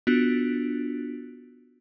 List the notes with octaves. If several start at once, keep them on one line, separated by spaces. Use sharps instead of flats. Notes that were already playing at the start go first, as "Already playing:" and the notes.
B3 D4 F4 F#4